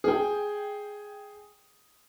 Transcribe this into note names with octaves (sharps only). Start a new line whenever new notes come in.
G#4 G5